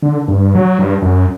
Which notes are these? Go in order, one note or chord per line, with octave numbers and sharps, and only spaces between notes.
D3
G2
F#3
G2
F#2